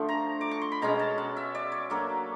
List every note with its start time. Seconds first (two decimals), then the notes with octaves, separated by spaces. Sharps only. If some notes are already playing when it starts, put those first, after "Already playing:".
Already playing: D3 F3 A3 D4
0.09 A#5
0.41 D6
0.51 C#6
0.62 C6
0.72 B5
0.82 B2 G#3 C#4 A#5
0.99 A5
1.18 F#5
1.37 E5
1.55 D5
1.72 C#5
1.90 F#3 A#3 D4 A4